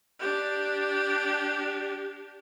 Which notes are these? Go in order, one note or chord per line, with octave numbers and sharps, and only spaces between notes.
D4 G4